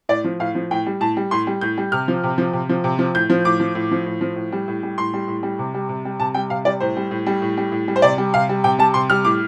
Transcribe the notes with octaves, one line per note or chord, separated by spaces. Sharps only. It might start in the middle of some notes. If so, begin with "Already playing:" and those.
A2 D5
F3
A2 F5
F3
A2 G5
G3
A2 A5
G3
A2 C6
G3
A2 G6
G3
C3 F6
F3
C3
F3
C3
F3
C3
F3
A2 G6
F3
A2 D6
F3
A2
F3
A2
F3
A2
G3
A2
G3
A2 C6
G3
A2
G3
C3
G3
C3
G3
C3 A5
G3 G5
C3 F5
G3 D5
A2 C5
G3
A2
G3
A2
G3
A2
G3
C5
C3 D5
G3
C3 F5
G3
C3 G5
G3 A5
C3 C6
G3 F6
A2 D6